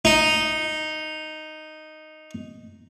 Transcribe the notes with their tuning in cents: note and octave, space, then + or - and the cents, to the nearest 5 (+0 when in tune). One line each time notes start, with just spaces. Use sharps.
D#4 -5